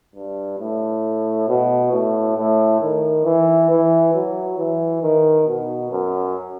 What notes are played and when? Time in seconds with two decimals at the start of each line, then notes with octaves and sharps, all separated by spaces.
0.15 G2
0.59 A2
1.49 B2
1.92 A2
2.37 A2
2.81 D#3
3.25 E3
3.71 E3
4.14 F#3
4.58 E3
5.03 D#3
5.48 B2
5.92 F#2